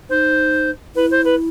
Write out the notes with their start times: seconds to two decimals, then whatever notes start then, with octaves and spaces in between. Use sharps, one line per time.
0.09 D#4 C5
0.95 E4 B4
1.10 C5
1.24 B4